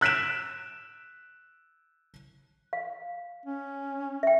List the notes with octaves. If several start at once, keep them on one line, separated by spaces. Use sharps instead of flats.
E6 F#6 B6 D7 E7
F5
C#4
E5 G5